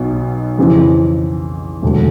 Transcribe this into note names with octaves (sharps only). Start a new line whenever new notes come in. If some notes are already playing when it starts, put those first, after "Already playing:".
Already playing: B1 B2 F#3
F2 C#3 E3
E1 D2 D3 F#3 A3